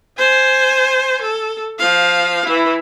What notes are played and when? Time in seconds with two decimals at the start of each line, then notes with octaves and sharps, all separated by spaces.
0.18 C5 G#5
1.22 A4
1.79 F3 F5
2.46 E3 E4